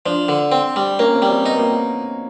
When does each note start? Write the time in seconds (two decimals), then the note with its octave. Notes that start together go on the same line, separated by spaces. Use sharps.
0.06 F3 D4
0.28 D3
0.52 C4
0.76 G3
0.99 A#3 C#4
1.15 C4
1.22 G3
1.30 C4
1.46 B3 D#4
1.58 A#3